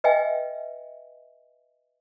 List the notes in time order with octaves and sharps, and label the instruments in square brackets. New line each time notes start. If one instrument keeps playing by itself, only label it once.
[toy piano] B4 D#5 E5 G5 G#5